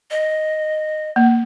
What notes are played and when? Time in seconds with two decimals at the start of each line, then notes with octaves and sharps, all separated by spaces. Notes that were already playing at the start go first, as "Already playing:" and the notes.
0.11 D#5
1.16 A#3